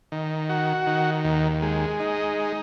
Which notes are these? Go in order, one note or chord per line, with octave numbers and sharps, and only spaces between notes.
D#3
F#4
D#3
D#2
G#3
D#4